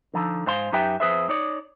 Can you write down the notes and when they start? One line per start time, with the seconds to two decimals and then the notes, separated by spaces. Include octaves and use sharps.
0.14 D3 F3 D#4
0.46 G#2 C5 F5 C6
0.72 F#2 D#4 G4 B4 E5 G5
1.00 F2 G#4 B4 C5 E5
1.29 D#4 C#5 D5